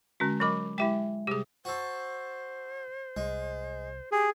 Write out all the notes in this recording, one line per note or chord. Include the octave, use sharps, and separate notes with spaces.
D3 G#3 C#4 F#4
F#3 A#4 D#5 B5 D6
G#3 E4 G4 E5 G5
C3 G3 G4 G#4
F#4 A4 C5
C2 G#3
G4 G#4